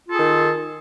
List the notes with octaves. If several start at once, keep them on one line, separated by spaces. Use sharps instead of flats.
D#3 F4 G#4 A4